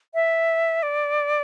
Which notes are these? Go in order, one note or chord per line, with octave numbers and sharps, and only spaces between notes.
E5
D5